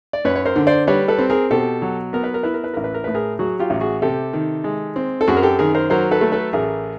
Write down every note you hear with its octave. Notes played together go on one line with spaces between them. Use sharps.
D5
F#2 B4 C#5
C#5
A#4 C5
D3
C5 D5
G3 B4 C#5
A4 B4
C4
G#4 A#4
B2 G4 A4
F#3
B3 A#4
B4
A#4
E4 B4
A#4
B4
A1 A#4
B4
A#4
A2 B4
G#4 A#4
F#3 F#4 G#4
F4 G4
A1
F#4 G#4
C3 G4 A4
D#3
G#3
C4
A4
F#2 F#4 G#4
A#4
G4 A4
D#3 G#4 A#4
A#4 C5
F#3 A#4 C5
A4 B4
A3
A4 B4
A1 G#4 A#4